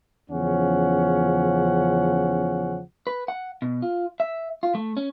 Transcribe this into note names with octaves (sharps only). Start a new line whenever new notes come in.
E2 C#3 F3 C#4 F#5
B4
F#5
B2
F4
E5
F4
A3
C#4